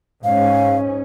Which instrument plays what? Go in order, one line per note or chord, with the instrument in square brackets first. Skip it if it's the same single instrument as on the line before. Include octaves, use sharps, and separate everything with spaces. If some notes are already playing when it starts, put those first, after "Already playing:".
[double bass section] G#2 C#4 [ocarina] F5